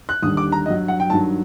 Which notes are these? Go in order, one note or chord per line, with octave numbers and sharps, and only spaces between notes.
F#6
D#2 D3 G3 D#6
D6
A#5
G2 F#3 D#5
F#5
G5
G2 D#3 F#3 A5